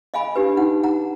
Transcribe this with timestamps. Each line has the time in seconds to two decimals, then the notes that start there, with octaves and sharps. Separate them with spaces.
0.14 D#5 F5 G#5 B5
0.36 D4 G4 B4
0.57 D#4 F#5
0.83 F#5 A#5